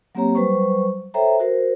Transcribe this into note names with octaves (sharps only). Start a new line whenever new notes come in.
F#3 A#3 C4 G4 C#5 A#5
F#3 G3 B4 C5 C#6
A4 C5 C#5 E5 G5 A#5
F#4 A#4 C5